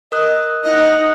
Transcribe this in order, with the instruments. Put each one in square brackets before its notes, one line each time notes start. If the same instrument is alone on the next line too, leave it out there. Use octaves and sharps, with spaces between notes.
[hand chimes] A#4 D#6 F#6 [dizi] D#5
[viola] D#4 F#5 [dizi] D#5